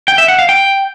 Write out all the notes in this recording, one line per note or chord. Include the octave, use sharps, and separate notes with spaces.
G5
E5
F#5
F5
G5